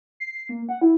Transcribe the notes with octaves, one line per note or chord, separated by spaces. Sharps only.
C7
A#3
F#5
E4